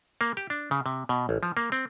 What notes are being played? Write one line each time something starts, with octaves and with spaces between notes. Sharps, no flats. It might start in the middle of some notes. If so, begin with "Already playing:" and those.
A#3
G4
D4
C#3
C3
B2
A1
F3
A#3
C4